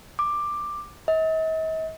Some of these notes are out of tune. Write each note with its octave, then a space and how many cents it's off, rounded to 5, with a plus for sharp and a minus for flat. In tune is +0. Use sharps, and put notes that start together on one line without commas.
D6 +10
D#5 +45